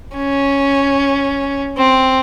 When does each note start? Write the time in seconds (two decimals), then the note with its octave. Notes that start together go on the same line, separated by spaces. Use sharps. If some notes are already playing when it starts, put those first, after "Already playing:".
0.16 C#4
1.78 C4